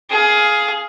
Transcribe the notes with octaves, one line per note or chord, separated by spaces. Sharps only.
G#4 F5